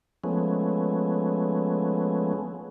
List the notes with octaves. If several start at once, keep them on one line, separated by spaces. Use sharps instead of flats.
F3 G#3 A3 B3 C#4